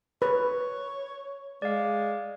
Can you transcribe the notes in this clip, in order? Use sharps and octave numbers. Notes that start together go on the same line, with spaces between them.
B4 C#5
G#3 D5 F5